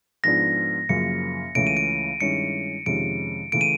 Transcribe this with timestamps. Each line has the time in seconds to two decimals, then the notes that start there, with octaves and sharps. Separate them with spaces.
0.24 G#2 F3 G#3 B3 D4 A#6
0.89 F#2 C#3 F3 A#3 C#7
1.55 C#2 C#3 E3 A3 C#4 D7
1.67 D#7
1.77 D7
2.20 G2 D#3 G#3 C#4 E4 C#7
2.86 F2 C3 D#3 G#3 C#4 D7
3.52 C#3 E3 A3 D7
3.61 D#7